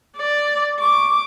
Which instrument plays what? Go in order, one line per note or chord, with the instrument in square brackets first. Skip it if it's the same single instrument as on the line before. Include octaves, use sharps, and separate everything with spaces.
[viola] D5
[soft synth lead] C#6 [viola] D6